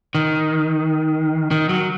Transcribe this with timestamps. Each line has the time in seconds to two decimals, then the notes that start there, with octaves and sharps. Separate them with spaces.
0.15 D#3
1.51 D#3
1.69 F#3